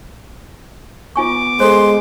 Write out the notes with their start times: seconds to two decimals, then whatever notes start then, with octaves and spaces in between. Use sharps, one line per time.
1.16 B3 F4 G#5 C#6 D6
1.60 G#3 A4 C5 C6